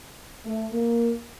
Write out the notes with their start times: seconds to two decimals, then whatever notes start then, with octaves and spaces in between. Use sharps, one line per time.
0.45 A3
0.72 A#3